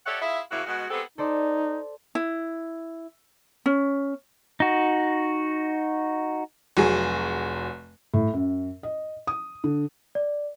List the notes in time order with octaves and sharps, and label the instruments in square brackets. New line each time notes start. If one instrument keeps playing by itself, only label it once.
[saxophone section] G4 A4 C#5 D5 E5 F#5
E4 F4 G#4 E5
A2 C#3 A#3 E4 F#4
B2 G#3 F#4
G#3 B3 C4 G4 A4
[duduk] D#4 [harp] A4 C5 D5
[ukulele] E4
C#4
[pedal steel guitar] D#4 F#4
[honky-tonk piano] F1 F#3 G#4
[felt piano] A2
F#2
D#5
D#6
D3
[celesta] D5